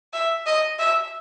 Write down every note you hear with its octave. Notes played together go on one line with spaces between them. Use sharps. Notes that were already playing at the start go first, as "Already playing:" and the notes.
E5
D#5
E5